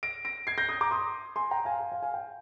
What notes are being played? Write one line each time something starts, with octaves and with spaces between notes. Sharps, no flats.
A#6 D7
A#6 D7
G#6 C7
G6 A#6
D#6 G6
A#5 D6
C6 D#6
G#5 C6
G5 A#5
F5 G#5
F5
F5
F5 G#5
G5